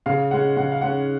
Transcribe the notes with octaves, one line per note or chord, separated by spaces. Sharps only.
C#3 F5
G#3 C#4 F#5
C#3 F#5
F5
G#3 C#4 F#5